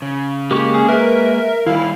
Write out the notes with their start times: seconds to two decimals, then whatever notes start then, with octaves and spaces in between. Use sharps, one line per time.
0.02 C#3
0.51 G#3 A#3 G4 C#6
0.74 C#4 G#4
0.88 A#4 B4 E5
1.66 D#3 G3 E4 F5